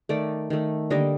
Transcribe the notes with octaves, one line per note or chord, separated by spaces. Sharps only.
D#3 A3 D5
D#3 A3
D3 G3 A#3 D#5